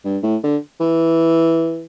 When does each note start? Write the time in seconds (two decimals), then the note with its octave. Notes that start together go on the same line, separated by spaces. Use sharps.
0.05 G2
0.23 A2
0.43 D3
0.80 E3